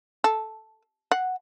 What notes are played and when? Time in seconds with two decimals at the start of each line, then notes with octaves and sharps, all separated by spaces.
0.24 A4
1.12 F#5